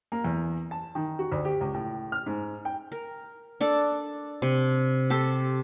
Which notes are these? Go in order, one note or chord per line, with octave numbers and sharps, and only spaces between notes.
A#3
E2
A5
D#3
F#4
D2
G4
C#2
A2
F6
G#2
G5
A#4
D4 A4 D5
C3
G4 A4 C5